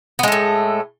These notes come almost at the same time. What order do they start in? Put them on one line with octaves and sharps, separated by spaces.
B3 G#3 A3 A2